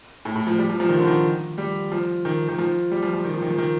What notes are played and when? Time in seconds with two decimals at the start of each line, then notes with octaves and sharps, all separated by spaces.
0.25 A2
0.36 A2
0.47 F3
0.58 G3
0.70 F3
0.80 F3
0.89 D#3
0.98 D3
1.07 D#3
1.58 G3
1.92 F3
2.25 D#3
2.48 D#3
2.58 F3
2.91 G3
3.03 F3
3.14 F3
3.25 D#3
3.34 F3
3.42 D#3
3.50 F3
3.58 D#3